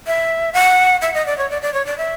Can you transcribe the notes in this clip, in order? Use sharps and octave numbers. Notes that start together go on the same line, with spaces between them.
E5
F#5
E5
D#5
D5
C#5
D5
D5
C#5
D5
E5